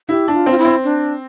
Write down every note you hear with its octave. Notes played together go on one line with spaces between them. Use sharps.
E4 G4
D4
F4
C4 F4
E4
C4
D4